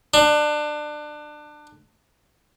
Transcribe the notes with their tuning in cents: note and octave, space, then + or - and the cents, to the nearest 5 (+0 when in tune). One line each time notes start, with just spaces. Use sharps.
D4 +25